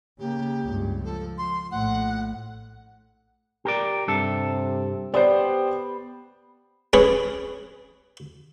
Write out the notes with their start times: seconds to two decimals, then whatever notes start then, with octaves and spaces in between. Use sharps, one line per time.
0.19 C#3 A#3 G4
0.63 C#2 G2
1.04 F3 A4
1.38 C6
1.71 A#1 A2 F#5
3.65 G4 A#4 D5
4.08 G2 C3 A4
5.14 B3 G4 C5 D5
6.93 C#4 G#4 B4